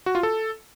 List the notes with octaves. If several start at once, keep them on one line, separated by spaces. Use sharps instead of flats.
F#4
F4
A4